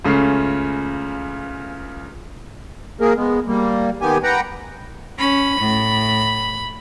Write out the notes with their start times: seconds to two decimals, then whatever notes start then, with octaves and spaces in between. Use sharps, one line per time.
0.05 C#2 C#3 A3 C#4 C7
3.01 A#3 G#4 A#4
3.16 G#3 B3
3.47 G3 A#3
4.01 D#3 B3 G4 G#5
4.23 B4 F#5 G5 A#5
5.19 C#4 B5
5.61 A2